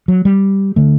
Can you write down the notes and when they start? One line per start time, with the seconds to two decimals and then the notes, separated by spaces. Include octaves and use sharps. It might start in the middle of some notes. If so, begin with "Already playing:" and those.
0.08 F#3
0.25 G3
0.76 D3 A3